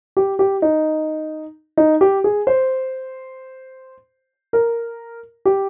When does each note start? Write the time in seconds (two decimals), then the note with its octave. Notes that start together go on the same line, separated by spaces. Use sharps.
0.17 G4
0.39 G4
0.62 D#4
1.77 D#4
2.01 G4
2.24 G#4
2.47 C5
4.53 A#4
5.46 G4